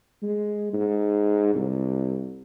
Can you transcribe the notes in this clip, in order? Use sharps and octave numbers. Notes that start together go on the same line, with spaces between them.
G#3
G#2
C2